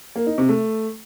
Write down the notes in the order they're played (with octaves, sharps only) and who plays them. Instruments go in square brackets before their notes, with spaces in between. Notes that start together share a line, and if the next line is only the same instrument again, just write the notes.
[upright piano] A#3
D#4
C3
A3